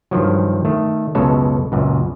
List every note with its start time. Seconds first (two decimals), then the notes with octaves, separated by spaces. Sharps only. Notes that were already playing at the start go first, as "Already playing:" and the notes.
0.11 G2 D#3 F3 F#3
0.65 D#3 A3
1.15 C#2 F#2 B2 G#3 A4 C#5
1.72 C#2 F#2 A#2